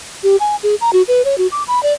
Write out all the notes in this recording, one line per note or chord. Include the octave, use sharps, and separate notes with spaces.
G4
G#5
G#4
A#5
F#4
B4
C#5
F#4
D6
B5
D5